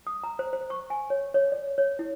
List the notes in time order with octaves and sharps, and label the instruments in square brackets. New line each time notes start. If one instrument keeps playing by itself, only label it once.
[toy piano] D#6
A#5
C5
C5
C#6
G#5
C#5
C#5
D5
C#5
E4